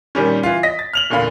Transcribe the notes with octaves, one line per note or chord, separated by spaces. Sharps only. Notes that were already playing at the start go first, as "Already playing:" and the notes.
A#2 D#3 G3 C#4
E3 F4
D#5 A#6 B6
A6
F6 F7 F#7
E2 A#2 D3 F5 B5